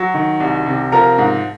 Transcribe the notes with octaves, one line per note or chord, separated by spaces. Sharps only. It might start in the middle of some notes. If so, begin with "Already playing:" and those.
Already playing: F#3
D#3
C2
C3
F3 A#4 A#5
G#2